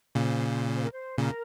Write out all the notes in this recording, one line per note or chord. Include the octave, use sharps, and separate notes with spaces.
A#2 C#3 C5
C#5
C5
A#4
C5
A#2 C#3 A#4